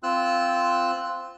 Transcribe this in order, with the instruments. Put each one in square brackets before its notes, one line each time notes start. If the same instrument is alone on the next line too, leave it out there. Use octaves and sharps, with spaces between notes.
[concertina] C4 F4 E6 F#6